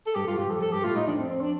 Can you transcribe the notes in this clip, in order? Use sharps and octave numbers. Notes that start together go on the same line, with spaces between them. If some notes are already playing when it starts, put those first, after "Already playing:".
A4
G2 G4
G2 F4
G2 G4
F2 A4
F2 A4
G2 G4
A2 F4
A2 D#4
F2 D4
C4
C4
D4